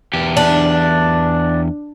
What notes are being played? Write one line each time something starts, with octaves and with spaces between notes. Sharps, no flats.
E2 G4
D4